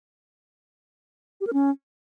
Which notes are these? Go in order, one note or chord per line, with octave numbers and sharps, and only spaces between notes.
G4
A#4
C#4